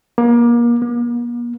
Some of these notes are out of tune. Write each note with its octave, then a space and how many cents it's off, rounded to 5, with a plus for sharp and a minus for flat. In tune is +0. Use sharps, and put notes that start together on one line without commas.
A#3 +30
A#3 +45